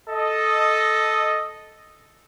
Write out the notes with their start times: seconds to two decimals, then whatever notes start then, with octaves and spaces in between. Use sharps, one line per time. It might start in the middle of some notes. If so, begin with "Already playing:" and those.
0.10 A4 D#5